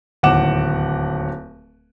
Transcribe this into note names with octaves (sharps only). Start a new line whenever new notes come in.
D1 D#2 F#5 D6 E7